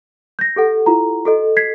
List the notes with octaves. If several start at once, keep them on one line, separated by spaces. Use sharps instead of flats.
G6 A#6
G4 A4 F#5
E4 F4 A#5
F#4 A4 D#5
G#6 B6 C7